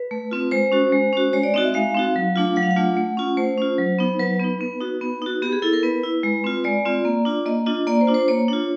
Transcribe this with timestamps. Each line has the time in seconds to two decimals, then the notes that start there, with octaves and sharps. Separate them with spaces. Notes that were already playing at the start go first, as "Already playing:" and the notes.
Already playing: B4
0.11 A3
0.31 C4 F4
0.51 G#3 C5
0.72 C#4 F#4
0.92 G#3
1.13 C#4 F#4
1.33 G#3 C#5
1.43 D5
1.54 C4 D#4 F#4 D#5
1.64 E5
1.74 G#3 F5
1.95 C4 D#4 F#4
2.16 F#3
2.36 A3 D4 F4
2.56 F#3 F#5
2.63 F5
2.71 F#5
2.76 A3 D4 F4
2.97 A3
3.17 C#4 F4
3.37 A3 C5
3.58 C#4 F4
3.78 F#3
3.99 B3 D#4
4.19 F#3 B4
4.40 B3 D#4
4.61 B3
4.80 D#4 F#4
5.01 B3
5.22 D#4 F#4
5.42 B3 G4
5.52 G#4
5.62 E4 A4
5.73 A#4
5.83 B3 B4
6.03 E4
6.23 G#3
6.44 C4 F4
6.64 G#3 D5
6.85 C4 F4
7.05 A#3
7.25 D4 F4
7.46 A#3 D#5
7.66 D4 F4 D#5
7.87 A#3 D5
8.01 C5
8.07 D4 F4
8.14 C5
8.28 A#3 C#5
8.48 D4 F4